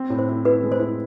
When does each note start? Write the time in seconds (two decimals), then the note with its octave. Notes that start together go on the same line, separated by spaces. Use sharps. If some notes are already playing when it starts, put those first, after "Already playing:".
Already playing: C4
0.10 A2
0.19 C5
0.28 E4
0.45 E4 B4
0.63 G#3
0.72 C5
0.80 E4